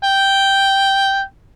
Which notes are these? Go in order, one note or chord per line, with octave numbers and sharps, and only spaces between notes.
G5